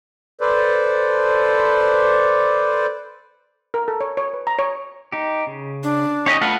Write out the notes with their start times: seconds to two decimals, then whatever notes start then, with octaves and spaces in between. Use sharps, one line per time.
0.41 A4 B4 C5 D5
3.74 A#4
3.88 A4
4.01 C#5
4.17 C#5
4.33 B4
4.47 A#5
4.59 C#5
5.12 D#4 G4
5.47 C#3
5.83 D4
6.26 C#4 D#4 G4 C#5 D#5
6.41 A3 F4 B4 F#5